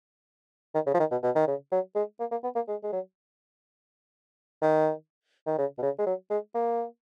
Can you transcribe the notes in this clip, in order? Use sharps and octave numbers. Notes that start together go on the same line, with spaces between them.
D#3
C#3
F3
D#3
B2
B2
D#3
C#3
F#3
G#3
A#3
A#3
B3
A#3
G#3
G#3
F#3
D#3
D#3
C#3
B2
C#3
G#3
F#3
G#3
A#3